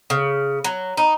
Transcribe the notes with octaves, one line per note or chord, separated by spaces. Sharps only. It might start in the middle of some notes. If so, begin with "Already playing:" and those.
C#3
F#3
D#4